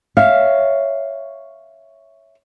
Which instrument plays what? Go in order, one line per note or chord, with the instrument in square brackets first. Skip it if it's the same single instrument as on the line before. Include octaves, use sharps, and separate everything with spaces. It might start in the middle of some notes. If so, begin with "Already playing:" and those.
[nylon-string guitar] C#5 E5 F5